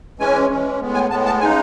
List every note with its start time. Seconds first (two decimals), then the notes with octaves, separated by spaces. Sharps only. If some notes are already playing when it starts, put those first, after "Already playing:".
0.19 E3 G#3 C#4 G#5
0.50 E3 G#3 C#4
0.81 A2 G#3 B3
0.95 G#5
1.10 A2 G#3 B3 A5
1.26 A5
1.40 C#3 G#3 D#4 G#5